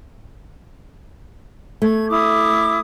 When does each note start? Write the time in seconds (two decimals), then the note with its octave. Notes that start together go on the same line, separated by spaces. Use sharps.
1.82 A3 G#6
2.09 E4 D6 D#6